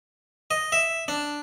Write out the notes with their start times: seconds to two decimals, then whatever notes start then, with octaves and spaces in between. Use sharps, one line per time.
0.51 D#5
0.72 E5
1.08 D4